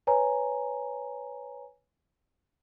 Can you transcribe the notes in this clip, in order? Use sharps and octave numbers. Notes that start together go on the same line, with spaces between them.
B4 C#5 G#5 A#5